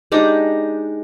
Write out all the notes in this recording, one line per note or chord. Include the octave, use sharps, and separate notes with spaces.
G#3 D4 D#4 G4